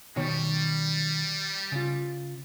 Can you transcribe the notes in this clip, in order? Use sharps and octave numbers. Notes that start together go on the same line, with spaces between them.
B2 D#3 G3 C#5
C#3 F4